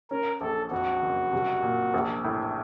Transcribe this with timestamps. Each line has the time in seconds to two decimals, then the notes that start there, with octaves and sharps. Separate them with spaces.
0.10 C#4 A#4
0.41 A#1 A4
0.71 F2 F#4
1.02 F#1
1.33 C2
1.63 A#2
1.94 A#1
2.24 A2